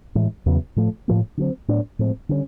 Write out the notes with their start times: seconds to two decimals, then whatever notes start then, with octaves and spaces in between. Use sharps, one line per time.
0.15 A2 E3 G#3
0.46 E2 C#3 F#3 B3
0.76 A2 F3 A3
1.08 A2 F3 A#3
1.37 D3 F#3 A3 C4
1.68 A2 F#3 B3 D4
1.99 A2 F3 G#3 C4
2.29 D3 G3 A#3 C#4